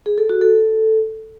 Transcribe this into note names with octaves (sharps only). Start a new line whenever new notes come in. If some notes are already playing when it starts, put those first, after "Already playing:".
G#4
A4
F#4
A4